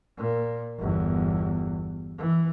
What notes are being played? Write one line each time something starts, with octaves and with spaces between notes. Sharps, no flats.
A#2
G1 E2
E3